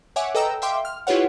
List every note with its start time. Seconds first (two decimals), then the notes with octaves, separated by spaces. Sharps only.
0.16 C#5 E5 F#5 G#5 D6
0.35 A4 B4 D#5 G5 A#5 E6
0.62 E5 F5 G5 C6 D6
0.85 F6
1.07 E4 F4 G4 B4 C#5 F#5